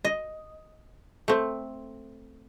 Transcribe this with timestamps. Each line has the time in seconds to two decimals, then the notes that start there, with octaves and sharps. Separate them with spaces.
0.05 D#5
1.28 A3 C4